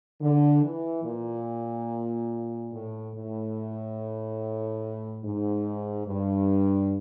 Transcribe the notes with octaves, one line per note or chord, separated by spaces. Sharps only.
D3
E3
A#2
A2
A2
G#2
G2